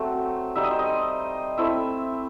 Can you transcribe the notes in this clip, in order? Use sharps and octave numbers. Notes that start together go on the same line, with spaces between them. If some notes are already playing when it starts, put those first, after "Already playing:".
Already playing: F#3 A3 C4
G3 D#4 E5
D#5
C5
D#5
A3 C4 E4 E5